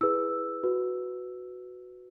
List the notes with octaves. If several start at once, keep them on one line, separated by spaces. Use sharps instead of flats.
E4 G#4 B4 E6
F#4 B4